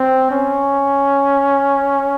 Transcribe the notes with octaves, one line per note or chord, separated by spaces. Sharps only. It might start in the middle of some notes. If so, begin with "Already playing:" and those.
Already playing: C4
C#4